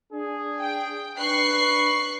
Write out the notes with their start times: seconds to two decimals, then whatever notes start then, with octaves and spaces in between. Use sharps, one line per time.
0.12 D4 G#4
0.61 G5
1.18 D4 B4 C#6 F#6 C7